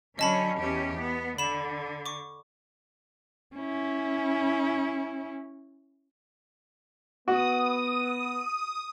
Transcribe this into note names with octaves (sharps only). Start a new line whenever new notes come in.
D3 F#3 C#4 D#5 A5 B5
E2 C#4 G4
B3
D3 B5 E7
C#6 D6
C#4 E4
B3 F#4 D#6